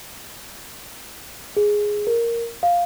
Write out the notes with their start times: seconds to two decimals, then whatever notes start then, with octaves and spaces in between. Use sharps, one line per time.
1.57 G#4
2.07 A#4
2.63 F5